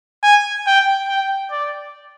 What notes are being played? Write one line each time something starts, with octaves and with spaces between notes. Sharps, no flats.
G#5
G5
G5
D5